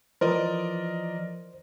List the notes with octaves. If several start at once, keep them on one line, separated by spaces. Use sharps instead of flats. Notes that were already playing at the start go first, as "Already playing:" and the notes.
E3 F3 A#4 C5 D5 D#5